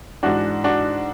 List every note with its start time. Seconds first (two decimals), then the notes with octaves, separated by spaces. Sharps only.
0.23 G#2 E3 D4 F#4
0.64 D4 F#4